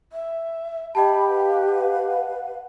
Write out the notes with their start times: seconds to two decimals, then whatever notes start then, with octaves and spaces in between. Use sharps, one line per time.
0.12 E5
0.95 G4 D#5 G5 A5 B5
1.28 B4 F5 F#5